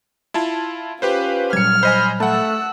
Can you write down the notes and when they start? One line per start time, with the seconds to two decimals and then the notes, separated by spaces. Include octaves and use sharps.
0.34 E4 F4 A5
1.02 C#4 F4 G4 B4 C5
1.53 A#2 F#3 G3 F6 G#6 C#7
1.83 C5 D#5 G#5 B5
2.20 A3 F#5 A5 E6 F#6